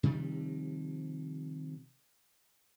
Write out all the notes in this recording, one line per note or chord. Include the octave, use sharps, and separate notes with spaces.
C3 D#3 F3 G3